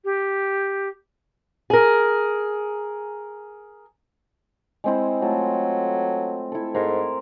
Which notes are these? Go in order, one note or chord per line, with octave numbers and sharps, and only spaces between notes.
G4
G#4 A#4
G#3 C4 E4
F#3 A3 F4 A4
E4 A4
G#2 A#4 C5